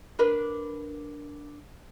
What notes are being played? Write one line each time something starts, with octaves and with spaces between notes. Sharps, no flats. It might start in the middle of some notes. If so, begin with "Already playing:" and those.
D4 A#4 B4